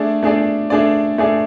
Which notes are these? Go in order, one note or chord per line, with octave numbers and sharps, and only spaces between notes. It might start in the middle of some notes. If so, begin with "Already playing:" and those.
Already playing: A3 D4 G#4 D5
A3 D4 G#4 D5
A3 D4 G#4 D5
A3 D4 G#4 D5